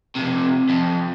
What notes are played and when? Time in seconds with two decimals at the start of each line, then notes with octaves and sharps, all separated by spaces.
0.15 F2 C3
0.69 F2